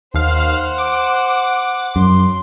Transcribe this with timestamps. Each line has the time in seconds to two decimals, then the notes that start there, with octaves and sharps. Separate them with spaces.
0.14 D#2 C5 F5 F#5
0.78 D6
1.96 F#2 C6